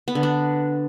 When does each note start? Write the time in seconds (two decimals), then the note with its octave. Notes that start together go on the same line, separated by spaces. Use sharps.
0.08 B3
0.15 D3
0.23 D4